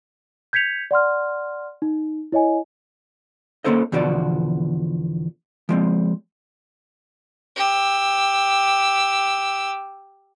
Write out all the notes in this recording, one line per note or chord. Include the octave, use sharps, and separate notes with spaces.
G6 G#6 B6 C#7 F7
D5 F#5 C6 F6
D#4
E4 C#5 D#5 G#5
A#3 C4 C#4 A4 C5 D#5
E2 B2 D3 F3 F#4 D5
F3 G#3 C4
G4 E6